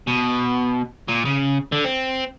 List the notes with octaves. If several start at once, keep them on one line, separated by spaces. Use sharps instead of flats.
B2
A#2
C#3
D3
C4